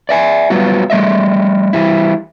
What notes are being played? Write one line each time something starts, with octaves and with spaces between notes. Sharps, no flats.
D5 E5 G#5
F#3 G3 B3 F4 F#4
G3 A3 D#5 E5
E3 G3 E4